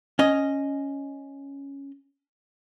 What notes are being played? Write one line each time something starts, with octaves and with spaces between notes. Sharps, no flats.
C#4 D#5